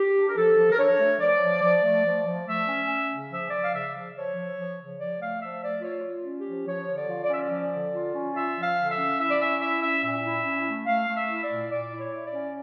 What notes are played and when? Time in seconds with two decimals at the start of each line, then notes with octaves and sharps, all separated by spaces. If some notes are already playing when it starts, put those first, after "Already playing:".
Already playing: G4
0.15 D4
0.28 A#4
0.36 F3 A4
0.57 F3
0.72 A#4
0.78 D4 C#5
0.99 A3
1.20 F3 D5
1.42 F3
1.62 F3
1.83 A3
2.05 F3
2.26 F3
2.47 A3 E5
2.68 C#4
2.88 C#4
3.09 C#3
3.30 F3 E5
3.51 F3 D5
3.62 F5
3.72 C#3 E5
3.93 F3
4.14 F3 C#5
4.36 F3
4.56 F3
4.78 C#3
4.98 F3 D5
5.19 A3 F5
5.41 F3 E5
5.61 A3 D5
5.82 F4 C#5
6.03 F4
6.24 C#4
6.38 G4
6.45 F3
6.66 F3 C#5
6.87 D3
6.94 D5
7.08 F4
7.23 D5
7.29 C#4 E5
7.40 D5
7.50 F3
7.71 D3
7.92 F4
8.13 C#4
8.34 F4 E5
8.55 F3
8.62 F5
8.77 D3
8.90 E5
8.97 C#4
9.18 E4 E5
9.29 D5
9.39 C#4 E5
9.60 E4 E5
9.80 C#4 E5
10.02 A#2 E5
10.23 E4
10.43 C#4
10.66 A3
10.86 A3 F5
11.08 A3
11.14 E5
11.28 E4
11.42 D5
11.49 A#2
11.70 A#2 D5
11.91 E4
11.97 C#5
12.12 E4
12.26 D5
12.32 C#4